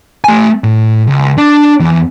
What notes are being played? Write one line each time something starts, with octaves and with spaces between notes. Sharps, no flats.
A3 G#5
A2
C#2
D4
E2